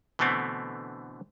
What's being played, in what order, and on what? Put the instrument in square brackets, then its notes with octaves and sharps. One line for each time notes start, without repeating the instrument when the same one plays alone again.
[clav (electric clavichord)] B2 D3 E3 A3 B3 C4